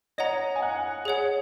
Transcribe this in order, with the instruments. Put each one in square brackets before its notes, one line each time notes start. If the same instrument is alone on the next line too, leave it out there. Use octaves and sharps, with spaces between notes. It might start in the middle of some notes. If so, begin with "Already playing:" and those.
[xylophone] C#5 F#5 A#5 [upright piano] D#5
[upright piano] G#5
F#5
[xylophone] G#4 C#5 F#5